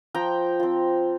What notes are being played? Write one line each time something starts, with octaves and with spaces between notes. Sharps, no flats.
F3 G5 A#5
C4 F4